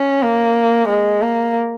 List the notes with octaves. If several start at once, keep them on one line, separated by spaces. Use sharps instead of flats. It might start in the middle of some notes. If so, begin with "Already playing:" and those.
Already playing: C#4
A#3
G#3
A#3